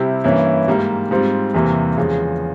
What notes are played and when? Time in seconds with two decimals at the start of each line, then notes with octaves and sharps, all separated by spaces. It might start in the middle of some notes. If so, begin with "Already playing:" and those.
Already playing: C3 G3 C4 E4
0.24 G2 E3 A#3 C#4 E4
0.68 G#2 G3 A#3
1.11 G#2 G3 C4 F4
1.54 E2 C3 E3 G3 A#3
1.97 E2 C#3 F3 G#3